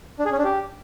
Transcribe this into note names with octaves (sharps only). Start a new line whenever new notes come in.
D4
G#4
C#4
D4
G4